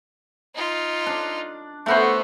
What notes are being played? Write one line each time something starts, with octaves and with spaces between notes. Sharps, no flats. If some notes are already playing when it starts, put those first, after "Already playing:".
D#4 F4
D4
A3 B3 F#4 C5